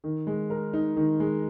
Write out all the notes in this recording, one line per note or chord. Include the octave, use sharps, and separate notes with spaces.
D#3
G#3
A#4
D#4
D#3
G#3